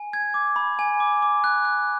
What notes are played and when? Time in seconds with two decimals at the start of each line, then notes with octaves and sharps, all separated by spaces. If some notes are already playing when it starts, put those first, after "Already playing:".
Already playing: G#5
0.13 G#6
0.34 D6
0.56 B5
0.79 G#5
1.00 D6
1.22 D6
1.44 F#6
1.65 F#6